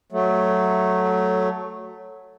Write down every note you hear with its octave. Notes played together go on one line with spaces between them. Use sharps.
F#3 A3